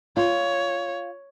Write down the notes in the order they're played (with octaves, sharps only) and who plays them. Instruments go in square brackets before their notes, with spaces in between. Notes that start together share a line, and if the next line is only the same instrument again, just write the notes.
[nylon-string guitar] F4 [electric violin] C#5